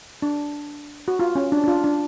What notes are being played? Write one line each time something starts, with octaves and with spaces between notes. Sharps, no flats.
D4
F#4
F4
C#4
D4
D4
F4
D4